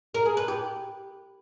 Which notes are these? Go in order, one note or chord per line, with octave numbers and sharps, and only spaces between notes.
A#4
G#4
B4
G4